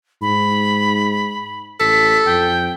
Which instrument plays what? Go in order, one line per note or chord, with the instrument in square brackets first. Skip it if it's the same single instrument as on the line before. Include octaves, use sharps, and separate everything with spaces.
[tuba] G#2 [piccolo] B5
[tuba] A1 [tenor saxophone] A4 [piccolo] B6
[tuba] F2 [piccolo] G5